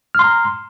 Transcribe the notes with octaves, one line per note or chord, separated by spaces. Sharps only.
A#5 C6 F6